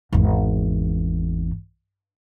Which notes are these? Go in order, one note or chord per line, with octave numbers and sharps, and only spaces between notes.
G#1 E2